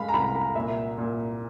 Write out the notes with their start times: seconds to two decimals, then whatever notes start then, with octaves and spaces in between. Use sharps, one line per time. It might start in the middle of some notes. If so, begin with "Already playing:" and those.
Already playing: G#3 F5 B5
0.08 A#5
0.13 C2 B5
0.35 A#5
0.55 A#2 E5
0.98 A#2